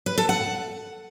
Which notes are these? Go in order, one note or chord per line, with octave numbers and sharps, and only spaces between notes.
B4
A4
F#5